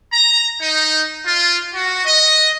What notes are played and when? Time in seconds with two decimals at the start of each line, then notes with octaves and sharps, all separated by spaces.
0.12 A#5
0.60 D#4
1.24 F4
1.74 F#4
2.04 D#5